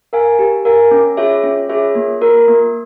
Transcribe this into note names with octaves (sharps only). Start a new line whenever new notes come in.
A#4 F5 G#5
G4
A#4 F5 G#5
C#4
F4 G#4 C#5 E5
C#4
F4 G#4 C#5 E5
A#3
F4 A#4
A#3